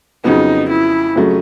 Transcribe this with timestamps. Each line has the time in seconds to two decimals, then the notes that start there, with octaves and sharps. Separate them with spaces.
0.24 F2 C#3 F#3 B3 D#4
0.70 E4
1.16 F2 C#3 F#3 A3